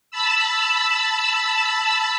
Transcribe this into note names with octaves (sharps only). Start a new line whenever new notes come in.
A5 B5 E6